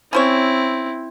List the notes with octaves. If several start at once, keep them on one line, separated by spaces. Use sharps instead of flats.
C4 C#4 E4 C5 C#5